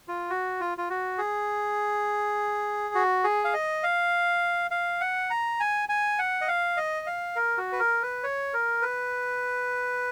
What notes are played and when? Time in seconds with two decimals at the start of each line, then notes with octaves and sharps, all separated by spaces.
0.08 F4
0.30 F#4
0.60 F4
0.78 F4
0.90 F#4
1.18 G#4
2.95 F#4
3.24 G#4
3.44 F5
3.54 D#5
3.83 F5
4.71 F5
5.00 F#5
5.30 A#5
5.60 G#5
5.89 G#5
6.19 F#5
6.41 D#5
6.48 F5
6.77 D#5
7.07 F5
7.36 A#4
7.58 F#4
7.72 B4
7.80 A#4
8.02 B4
8.23 C#5
8.54 A#4
8.82 B4